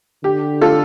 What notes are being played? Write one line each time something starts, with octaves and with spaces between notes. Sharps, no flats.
D3 G4
F4 A4